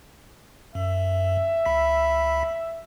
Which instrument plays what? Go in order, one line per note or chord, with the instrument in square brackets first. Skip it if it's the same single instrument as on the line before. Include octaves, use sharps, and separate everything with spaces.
[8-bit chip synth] F#2 [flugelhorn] E5
[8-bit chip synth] C#2 B5 B6